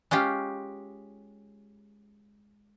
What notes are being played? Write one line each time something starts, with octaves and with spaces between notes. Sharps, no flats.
G#3 C#4 F4 G4